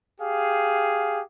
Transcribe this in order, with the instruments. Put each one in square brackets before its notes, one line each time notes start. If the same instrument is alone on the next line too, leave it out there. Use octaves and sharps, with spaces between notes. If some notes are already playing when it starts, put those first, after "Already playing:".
[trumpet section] G4 G#4 F5